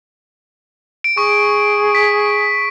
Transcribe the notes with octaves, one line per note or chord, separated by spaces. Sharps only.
D7
G#4 C#6
B6